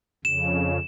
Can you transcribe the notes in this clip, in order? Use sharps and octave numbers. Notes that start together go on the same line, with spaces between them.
F2 C#3 E7